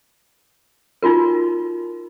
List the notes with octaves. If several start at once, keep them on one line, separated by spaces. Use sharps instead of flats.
D#4 F4 F#4 A#4